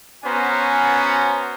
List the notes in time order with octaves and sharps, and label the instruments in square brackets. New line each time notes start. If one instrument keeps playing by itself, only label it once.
[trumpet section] B3 C#4 F#4 C5 G#5 A#5